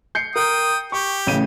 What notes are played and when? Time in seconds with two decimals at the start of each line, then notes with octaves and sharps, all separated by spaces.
0.15 G6 C7 C#7
0.36 A#4 G5 D#6
0.92 G4 C#6
1.27 A1 C#3 D#7